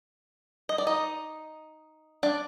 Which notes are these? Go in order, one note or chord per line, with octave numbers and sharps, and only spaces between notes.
D#5
D5
D#4 D#5
D4 D5